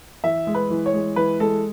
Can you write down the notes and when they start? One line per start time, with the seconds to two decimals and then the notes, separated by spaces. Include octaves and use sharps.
0.24 E3 E5
0.47 G#3
0.55 B4
0.70 E3
0.86 C#5
0.94 G#3
1.16 E3 B4
1.40 G#3 A4